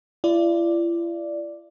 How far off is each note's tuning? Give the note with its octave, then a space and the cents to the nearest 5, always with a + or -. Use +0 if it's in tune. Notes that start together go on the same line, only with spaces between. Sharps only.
E4 +45 D5 +0